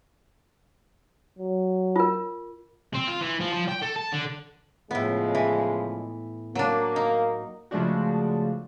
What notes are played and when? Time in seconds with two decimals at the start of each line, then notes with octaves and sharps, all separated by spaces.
1.39 F#3
1.96 F4 A#4
2.94 C4
3.07 F4
3.21 E3
3.40 F3
3.53 F3
3.68 G5
3.82 A4
3.96 A5
4.12 D3
4.91 A2 C#3 F3 G#3 B3
5.35 E3
6.55 F#3 A#3 D4
6.96 D#4
7.71 C#3 F3 G#3 A3 D4 F#4